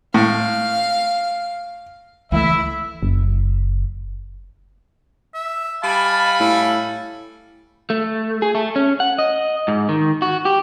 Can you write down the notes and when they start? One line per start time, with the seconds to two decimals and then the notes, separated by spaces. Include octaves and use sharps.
0.14 A2 F5
2.32 C#2 E3 A3 E4 E5
3.03 F#1
5.34 E5
5.83 G3 F5 G#5 A5 B5
6.40 A2 A4
7.90 A3
8.42 G#4
8.55 A3
8.76 C#4
9.00 F#5
9.19 D#5
9.68 G#2
9.89 D#3
10.22 F#4
10.45 G4